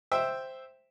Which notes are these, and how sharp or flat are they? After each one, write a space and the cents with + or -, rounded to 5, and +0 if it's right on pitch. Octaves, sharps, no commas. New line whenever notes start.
C5 +0 E5 +0 G5 +0